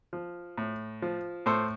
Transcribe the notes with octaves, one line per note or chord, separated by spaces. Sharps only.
F3
A2
F3
A2 A4 C5